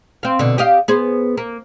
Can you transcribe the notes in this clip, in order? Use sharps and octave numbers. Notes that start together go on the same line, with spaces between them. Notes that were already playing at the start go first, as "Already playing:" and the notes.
C4 F5
B2 D3
G4 D#5 F5
B3 G#4 C5
A#3